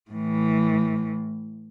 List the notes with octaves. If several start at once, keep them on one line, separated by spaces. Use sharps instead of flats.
A2 E3